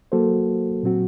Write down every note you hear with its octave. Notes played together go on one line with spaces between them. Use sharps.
F#3 A#3 F#4 A4 C5
A#2 F#3 C4 F#4